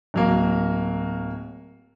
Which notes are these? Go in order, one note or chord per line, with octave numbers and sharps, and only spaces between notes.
D1 F#3 A#3